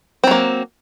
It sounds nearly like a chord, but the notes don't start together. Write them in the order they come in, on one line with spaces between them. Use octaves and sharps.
C4 F#3 A#3